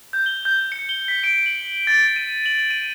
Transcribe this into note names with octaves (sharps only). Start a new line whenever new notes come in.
G6
G7
G6
C#7
G7
B6
D7
F#7
A6
D#7
F#7
D#7